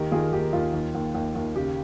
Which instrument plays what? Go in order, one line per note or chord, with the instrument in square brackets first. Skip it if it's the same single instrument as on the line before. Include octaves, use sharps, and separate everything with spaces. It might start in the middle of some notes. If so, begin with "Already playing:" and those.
Already playing: [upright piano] D#2 D#3 G4 A#4
D#3 F4 G#4
D#2 G4
D#2 F4
D#2
D#2
D#2
D#2
C#3 G4